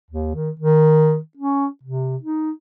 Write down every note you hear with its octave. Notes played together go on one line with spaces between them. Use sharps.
D#2
D#3
D#3
C#4
C3
D#4